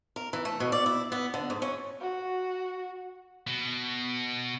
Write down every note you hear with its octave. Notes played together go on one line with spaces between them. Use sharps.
A#4
E3
A3
B2
D5
E4
B3
D3
G#2
C#4
F#4
B2